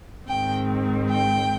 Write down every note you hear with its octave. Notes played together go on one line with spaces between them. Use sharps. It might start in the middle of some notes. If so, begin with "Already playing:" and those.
G#2 D#3 G#3 C4 G5
G5